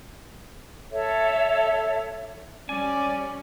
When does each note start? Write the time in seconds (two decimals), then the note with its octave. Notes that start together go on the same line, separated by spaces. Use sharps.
0.91 A4 C#5 E5
2.69 G3 C#4 D5 G#5